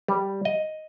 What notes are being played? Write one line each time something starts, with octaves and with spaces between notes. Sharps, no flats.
G3
D#5